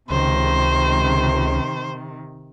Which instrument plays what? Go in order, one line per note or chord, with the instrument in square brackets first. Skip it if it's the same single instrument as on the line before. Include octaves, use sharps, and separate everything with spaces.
[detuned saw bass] C#2 [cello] C3 D#3 [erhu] C5